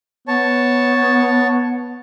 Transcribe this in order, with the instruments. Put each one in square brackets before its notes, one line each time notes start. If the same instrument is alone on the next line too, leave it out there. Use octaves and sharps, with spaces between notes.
[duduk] B3 [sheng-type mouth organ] C#5 A5